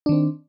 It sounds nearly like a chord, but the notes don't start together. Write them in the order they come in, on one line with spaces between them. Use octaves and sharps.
D4 D#3 C4